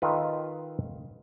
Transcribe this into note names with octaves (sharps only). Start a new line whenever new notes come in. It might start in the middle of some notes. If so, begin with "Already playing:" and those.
D#3 F4 A4 B4